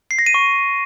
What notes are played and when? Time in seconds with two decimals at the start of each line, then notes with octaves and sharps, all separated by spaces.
0.11 C7
0.19 A#6
0.26 D#7
0.34 C#6